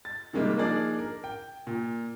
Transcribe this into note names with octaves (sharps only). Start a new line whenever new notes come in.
A6
C3 D#3 G3 G#3 A#3
F3 A#3 D4 D#4 G#4 D5
A#4
G5
A#2